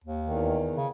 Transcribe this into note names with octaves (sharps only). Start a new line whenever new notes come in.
D#2
E2 D#3
C#3